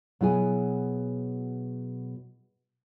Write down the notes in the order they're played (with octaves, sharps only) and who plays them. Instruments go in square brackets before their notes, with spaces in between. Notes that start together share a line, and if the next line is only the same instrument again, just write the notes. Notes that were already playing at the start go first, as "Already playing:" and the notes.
[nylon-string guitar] B2 F#3 E4 G#4 G#5